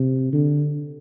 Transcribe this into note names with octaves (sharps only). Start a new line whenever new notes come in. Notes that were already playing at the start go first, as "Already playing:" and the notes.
Already playing: C3
D3